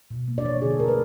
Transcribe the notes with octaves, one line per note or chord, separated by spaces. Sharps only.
B2
A#3
D5
F3 C#5
D3 G#4
A4
A3 A#4
B4